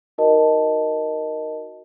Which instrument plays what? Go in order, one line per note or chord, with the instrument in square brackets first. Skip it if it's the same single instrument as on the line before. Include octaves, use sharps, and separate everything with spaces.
[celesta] D#4 F#4 A#4 D#5 A5